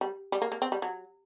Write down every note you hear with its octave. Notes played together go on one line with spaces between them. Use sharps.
G3
G3
A#3
A#3
C4
G3
F#3